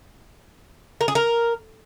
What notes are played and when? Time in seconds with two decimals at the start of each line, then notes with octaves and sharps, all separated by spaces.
1.01 A#4
1.08 G#4
1.15 A#4